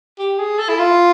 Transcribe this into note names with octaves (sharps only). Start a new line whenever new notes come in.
G4
G#4
A4
E4
F4